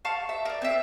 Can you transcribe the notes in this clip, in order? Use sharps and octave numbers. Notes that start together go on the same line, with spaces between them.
F5 A5 C#6
E5
D4 A#4
C4 E5